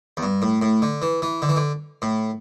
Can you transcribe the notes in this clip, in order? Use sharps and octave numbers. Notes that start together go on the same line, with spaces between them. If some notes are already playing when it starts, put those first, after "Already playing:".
E2
G2
A2
A2
D3
E3
E3
D3
E3
D3
A2